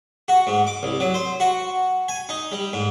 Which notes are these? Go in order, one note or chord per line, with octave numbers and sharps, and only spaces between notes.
F#4
G#2
D6
C2
F#3
C5
F#4
G#5
D#4
G3
G#2